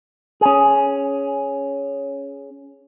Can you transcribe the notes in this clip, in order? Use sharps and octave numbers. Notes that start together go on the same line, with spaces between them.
C#4 G#4